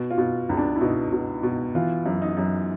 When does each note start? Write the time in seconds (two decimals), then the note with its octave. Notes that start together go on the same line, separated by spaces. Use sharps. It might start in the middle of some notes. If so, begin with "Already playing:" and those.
Already playing: B2
0.11 F4
0.18 B2
0.49 C#2
0.57 D4
0.76 E4
0.81 B2 D#4
1.12 B2
1.43 B2
1.75 E3 F4
2.06 F#2
2.22 D#4
2.37 F#2